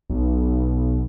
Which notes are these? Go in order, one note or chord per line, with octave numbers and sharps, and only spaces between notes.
B1